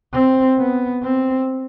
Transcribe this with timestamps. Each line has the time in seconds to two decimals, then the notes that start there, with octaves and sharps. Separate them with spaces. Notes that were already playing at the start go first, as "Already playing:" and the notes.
0.13 C4
0.58 B3
1.03 C4